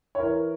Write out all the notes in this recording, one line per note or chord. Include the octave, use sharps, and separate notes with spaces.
C#5
E3 A#4